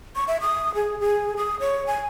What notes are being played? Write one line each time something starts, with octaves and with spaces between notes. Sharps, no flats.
C#6
E5
D#6
G#4
G#4
D#6
C#5
G#5